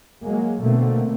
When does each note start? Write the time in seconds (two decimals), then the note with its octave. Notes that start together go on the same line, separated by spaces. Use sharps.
0.24 F#3 G#3 A#3
0.60 B2 D3 A3 A#3 C4